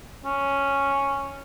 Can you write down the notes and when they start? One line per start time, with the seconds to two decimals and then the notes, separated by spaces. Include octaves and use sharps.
0.25 C#4